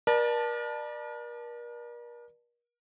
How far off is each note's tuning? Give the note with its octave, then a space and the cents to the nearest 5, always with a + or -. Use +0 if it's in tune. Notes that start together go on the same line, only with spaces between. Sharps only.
A#4 +40 D5 +25 A5 +0